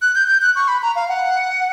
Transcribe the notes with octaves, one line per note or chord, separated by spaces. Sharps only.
F#6
G6
G6
F#6
C#6
B5
A#5
F5
F#5